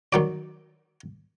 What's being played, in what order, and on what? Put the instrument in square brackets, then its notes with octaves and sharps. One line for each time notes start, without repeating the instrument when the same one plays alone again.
[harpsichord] D#3 F#3 D5